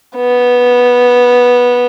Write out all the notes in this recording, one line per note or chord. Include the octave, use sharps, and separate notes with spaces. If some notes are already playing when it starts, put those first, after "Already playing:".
B3